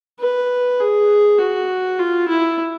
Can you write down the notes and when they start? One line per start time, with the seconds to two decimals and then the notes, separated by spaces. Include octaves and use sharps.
0.20 B4
0.80 G#4
1.39 F#4
1.99 F4
2.28 E4